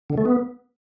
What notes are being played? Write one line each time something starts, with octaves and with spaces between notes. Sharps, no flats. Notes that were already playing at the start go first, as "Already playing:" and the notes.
D3
A3
B3